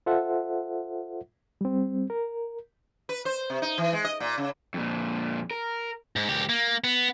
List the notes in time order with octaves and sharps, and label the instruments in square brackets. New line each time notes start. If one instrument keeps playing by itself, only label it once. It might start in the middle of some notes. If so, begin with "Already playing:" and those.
[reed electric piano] F4 A4 C5 E5 F#5
G3 C4
A#4
[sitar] B4
C5
C3
D#4
E3
G#3
D#5
A#2
C#3
[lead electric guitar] F2 A#2
A#4
[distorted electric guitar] G#2
C#2 G4
A#3
B3